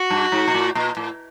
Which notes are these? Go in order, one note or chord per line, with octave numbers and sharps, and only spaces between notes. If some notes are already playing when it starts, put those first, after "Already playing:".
Already playing: F#4
G2
G#2
A#2
A2
A#2
A2